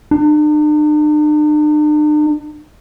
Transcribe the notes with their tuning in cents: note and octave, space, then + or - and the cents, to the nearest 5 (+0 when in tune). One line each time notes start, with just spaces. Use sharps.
D4 +45